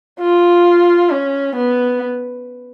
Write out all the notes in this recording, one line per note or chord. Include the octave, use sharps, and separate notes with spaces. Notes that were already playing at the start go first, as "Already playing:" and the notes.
F4
C#4
B3